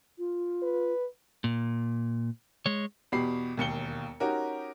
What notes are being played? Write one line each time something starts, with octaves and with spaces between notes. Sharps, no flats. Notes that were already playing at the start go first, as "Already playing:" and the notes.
F4
B4
A#2
G#3 C#5
E2 B2 G4 B5 C7
E1 D#2 C#7 G7
C#4 D#4 F#4 G4 A#4